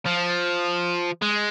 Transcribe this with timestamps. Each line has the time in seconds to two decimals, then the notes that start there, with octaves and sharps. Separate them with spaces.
0.06 F3
1.22 G#3